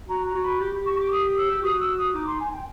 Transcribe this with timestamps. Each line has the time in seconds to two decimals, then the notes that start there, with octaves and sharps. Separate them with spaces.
0.09 F#4 A#5
0.26 A#5
0.35 F#4
0.43 B5
0.60 G4
0.75 G4
0.86 C#6
0.99 D6
1.12 D#6
1.37 E6
1.51 G4
1.62 F#4 D#6
1.80 E6
1.97 D#6
2.14 D#4 D6
2.27 C6
2.40 G#5
2.53 G5